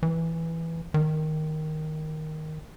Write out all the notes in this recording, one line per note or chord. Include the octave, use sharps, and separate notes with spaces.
E3
D#3